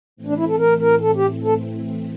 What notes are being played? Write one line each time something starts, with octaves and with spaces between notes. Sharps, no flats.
A2 E3 A3 C4
D4
E4
A4
A#4
A#4
A4
G4
A4